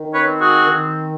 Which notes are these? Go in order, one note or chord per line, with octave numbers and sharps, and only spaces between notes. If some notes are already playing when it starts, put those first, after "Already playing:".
Already playing: D#3
B4 C#5
C4
F#4 G#4
D#3